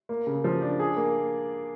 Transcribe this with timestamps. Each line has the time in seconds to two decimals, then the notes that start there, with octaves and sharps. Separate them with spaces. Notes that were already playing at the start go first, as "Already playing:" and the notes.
0.09 A#3
0.27 C#3
0.44 F3
0.62 D4
0.79 G#4
0.96 A#3